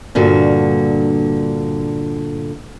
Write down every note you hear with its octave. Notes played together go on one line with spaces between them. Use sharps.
G2 A#2 D3 F#4